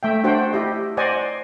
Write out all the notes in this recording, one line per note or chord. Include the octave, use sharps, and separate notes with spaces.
A3 E5 G5
D4 F#4 C5 F#5 G5
E4 G4 D#5
C5 D5 D#5 F#5 G#5